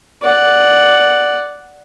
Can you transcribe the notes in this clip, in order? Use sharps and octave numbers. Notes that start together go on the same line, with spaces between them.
D5 F#5